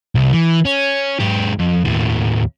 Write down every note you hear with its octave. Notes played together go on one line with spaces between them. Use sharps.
C2
E3
C#4
G#2 G4
F2
D#2 A2